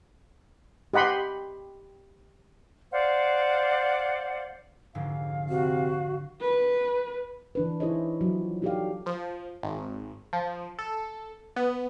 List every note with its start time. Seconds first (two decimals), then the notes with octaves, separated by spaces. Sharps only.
0.93 G4 D#5 F#5 B5 C6
2.91 C5 D5 F5 F#5
4.95 F1 G#2 D3 F5
5.49 C3 F#4
6.41 B4
7.55 E3 D4 B4
7.80 D#4 E4 G#4 C5 C#5 D#5
8.21 F3 F#3
8.62 D#4 F#4 G4 A4 D5 F5
9.06 F3
9.63 G#1
10.33 F3
10.79 A4
11.56 B3